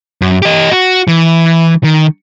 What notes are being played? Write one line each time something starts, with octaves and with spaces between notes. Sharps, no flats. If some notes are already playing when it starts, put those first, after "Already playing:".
F#2
G4 D#5
F#4
E3
D#3